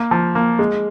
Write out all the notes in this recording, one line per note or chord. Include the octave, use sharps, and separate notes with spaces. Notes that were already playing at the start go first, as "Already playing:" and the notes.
Already playing: A#3
F3
A#3
G#3